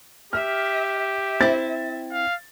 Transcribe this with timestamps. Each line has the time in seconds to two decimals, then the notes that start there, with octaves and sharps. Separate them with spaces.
0.33 G4 E5 F6
0.99 E5
1.41 C4 E4 A6
2.12 F5